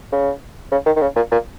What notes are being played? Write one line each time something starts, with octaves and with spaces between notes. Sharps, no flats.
C#3
C#3
D#3
D#3
C#3
A#2
A#2